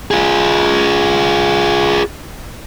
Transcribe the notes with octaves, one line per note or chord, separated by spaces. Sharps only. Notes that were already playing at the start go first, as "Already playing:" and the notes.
F4 G#4